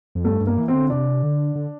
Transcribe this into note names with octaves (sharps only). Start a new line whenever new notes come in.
F2
G2 A3
G2
A#3
E3
C4
D3
C3 D4
D3
D3